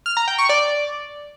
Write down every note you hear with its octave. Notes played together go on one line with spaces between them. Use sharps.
F6
A#5
G5
C#6
D5